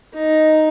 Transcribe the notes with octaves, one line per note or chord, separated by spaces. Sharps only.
D#4